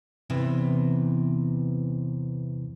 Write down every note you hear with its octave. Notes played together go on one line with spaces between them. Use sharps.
E2 C3 E3